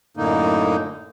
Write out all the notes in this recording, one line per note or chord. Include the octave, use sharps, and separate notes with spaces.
F#2 A2 D3 A#3 D#4